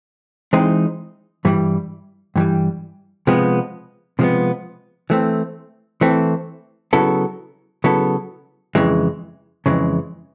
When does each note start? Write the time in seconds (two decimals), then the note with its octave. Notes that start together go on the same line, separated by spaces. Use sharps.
0.53 E3 G#3 C4 D#4
1.45 G2 E3 G3
2.36 G2 E3 G3
3.27 C3 F3 G#3 B3
4.19 C3 F3 G#3 B3
5.10 E3 A3 C4
6.01 E3 A3 C4
6.93 C#3 F#3 B3 E4 A4
7.84 C#3 F#3 B3 E4 A4
8.75 F2 C#3 E3 G#3
9.66 F2 C#3 E3 G#3